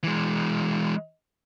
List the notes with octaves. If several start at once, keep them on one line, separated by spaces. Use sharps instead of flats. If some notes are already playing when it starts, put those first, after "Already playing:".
E3 G#3